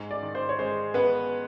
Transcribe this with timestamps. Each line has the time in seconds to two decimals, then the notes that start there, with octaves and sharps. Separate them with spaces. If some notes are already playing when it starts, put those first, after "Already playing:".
Already playing: G#2
0.11 D5
0.23 D#3
0.35 C5
0.49 C#5
0.59 G#3 C5
0.94 B3 B4